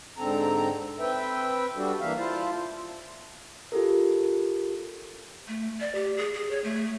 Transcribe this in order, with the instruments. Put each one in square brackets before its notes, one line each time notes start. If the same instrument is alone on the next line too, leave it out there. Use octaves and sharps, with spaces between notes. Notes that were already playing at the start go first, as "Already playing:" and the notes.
[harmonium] G#2 D3 C4 A4 A#5
C4 B4 E5 G5
G3 D4 F#4 A4
E3 A#3 D4 E5 F5
E4 F4 C5 A5
[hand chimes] F4 G4 A4 A#4
[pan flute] A3
D5
G4
G#4
G#4
C#5
A3